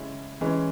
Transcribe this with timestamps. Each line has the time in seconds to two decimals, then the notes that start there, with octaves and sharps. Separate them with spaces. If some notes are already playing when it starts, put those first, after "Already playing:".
Already playing: C#3 G#3 C#4 E4
0.41 E3 G#3 C#4